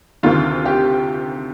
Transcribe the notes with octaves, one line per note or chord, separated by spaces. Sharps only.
D2 C3 D#3 F4
G4